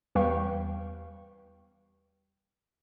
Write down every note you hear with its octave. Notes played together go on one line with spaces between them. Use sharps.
E2 G3 B4 F5 G5 C#6